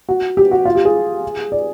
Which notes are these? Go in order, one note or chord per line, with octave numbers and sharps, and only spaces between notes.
F#4
G4
F#4
F4
G4
G#4
D5